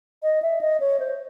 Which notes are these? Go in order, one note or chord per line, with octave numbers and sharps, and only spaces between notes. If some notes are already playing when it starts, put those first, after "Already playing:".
D#5
E5
D#5
C#5
C5